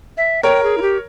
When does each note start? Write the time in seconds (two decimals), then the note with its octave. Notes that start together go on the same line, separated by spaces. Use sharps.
0.17 E5
0.43 A#4 C#5 G5
0.63 G#4
0.78 E4
0.82 G4